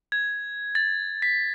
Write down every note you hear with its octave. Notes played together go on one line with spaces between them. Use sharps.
G#6
A6
B6